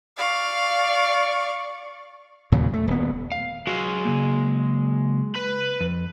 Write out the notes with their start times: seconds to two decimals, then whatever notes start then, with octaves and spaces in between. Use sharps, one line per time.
0.18 D5 F5 C#6
2.52 D#2 A#2 C#3 F#3
2.73 A3
2.87 D#1 B3
3.32 F5
3.67 F#3 G#3 F#4 F5
4.05 C#3 F#3 A#3
5.35 B4 B5
5.81 F2